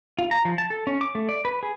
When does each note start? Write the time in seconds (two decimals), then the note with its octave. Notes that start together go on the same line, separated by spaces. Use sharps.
0.19 F4
0.31 A#5
0.45 F3
0.58 A5
0.70 A4
0.87 C#4
1.01 D6
1.15 A3
1.29 D5
1.45 B4
1.63 G#4